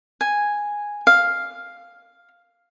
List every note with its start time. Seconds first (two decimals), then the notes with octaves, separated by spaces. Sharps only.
0.21 G#5
1.07 F5